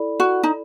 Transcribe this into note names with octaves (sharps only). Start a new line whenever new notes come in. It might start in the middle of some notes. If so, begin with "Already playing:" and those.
Already playing: E4 A4 D5 B5
F#4
D#4